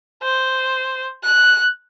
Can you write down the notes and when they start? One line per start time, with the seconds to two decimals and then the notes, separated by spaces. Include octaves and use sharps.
0.23 C5
1.24 F#6